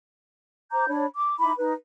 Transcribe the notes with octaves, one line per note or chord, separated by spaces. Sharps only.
C5 A#5 D6 G6
D4 C#5 B5
D6
D#4 E4 B5 D6
D#4 B4